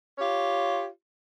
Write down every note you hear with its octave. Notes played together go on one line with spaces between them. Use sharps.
F4 G4 C#5